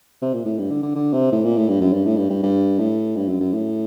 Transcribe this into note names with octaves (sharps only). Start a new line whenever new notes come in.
C3
A#2
A2
G2
D3
D3
D3
C3
A2
A#2
A2
G2
F#2
G2
A2
G2
G2
G2
A2
G2
F#2
F#2
A2